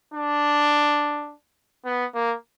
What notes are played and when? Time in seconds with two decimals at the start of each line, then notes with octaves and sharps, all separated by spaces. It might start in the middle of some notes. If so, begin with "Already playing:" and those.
0.14 D4
1.85 B3
2.14 A#3